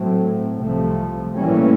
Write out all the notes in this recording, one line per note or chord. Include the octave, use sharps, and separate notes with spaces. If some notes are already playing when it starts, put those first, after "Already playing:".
Already playing: A2 F#3 A3 C4
C2 C3 F3 A3
A2 E3 G3 A#3 C#4